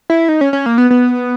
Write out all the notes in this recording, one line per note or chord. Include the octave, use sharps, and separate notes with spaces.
E4
D#4
C#4
C#4
A#3
B3
B3